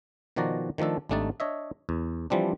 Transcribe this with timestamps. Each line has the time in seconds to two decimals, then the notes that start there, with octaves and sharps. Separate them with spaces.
0.36 B2 D#3 F3 F#4 D5 A#5
0.78 D#3 F3 A3 D4 A4
1.09 G#1 G3 A3 D4 D#4 A5
1.40 D4 C#5 D#5 E5
1.89 E2
2.30 E3 F3 G3 C4 D4